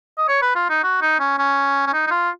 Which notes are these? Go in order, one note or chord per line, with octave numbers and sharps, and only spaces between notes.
D#5
C#5
B4
F4
D#4
F#4
D#4
C#4
C#4
C#4
D#4
D#4
F4